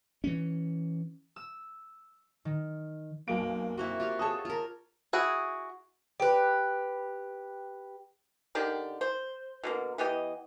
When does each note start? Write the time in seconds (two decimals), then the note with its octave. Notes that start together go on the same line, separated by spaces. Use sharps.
0.24 E3 C#4
1.36 E6
2.45 D#3
3.28 B1 F#2 A#3 D7
3.77 A#3 C4 E4 F#4
4.00 F4 G4 F5
4.19 G#4 A4 C#5 A5 D#6
4.45 F4 A#4
5.13 E4 F#4 G#4
6.20 G4 B4
8.55 D3 D#3 G4 D5
9.01 C5
9.63 B2 D3 A#3
9.98 E3 B3 G4 D#5